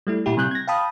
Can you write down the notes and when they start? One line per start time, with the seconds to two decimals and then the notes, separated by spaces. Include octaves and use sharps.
0.07 G3 A3 E4
0.26 A#2 E4 G4
0.37 C3 G3 F#6 G6
0.51 G#6 A#6
0.68 F5 G5 A5 B5 D#6